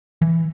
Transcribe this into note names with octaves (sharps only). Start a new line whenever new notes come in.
E3